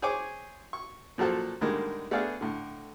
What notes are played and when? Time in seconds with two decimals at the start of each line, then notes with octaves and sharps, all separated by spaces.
0.02 G#4 C5 C#5 G#5 D6
0.73 C#6
1.18 A#2 F3 F#3 A4 C5
1.61 A2 D3 D#3 G3 G#3 A#3
2.11 A3 B3 D4 G#4 D5 F5
2.41 A2 D3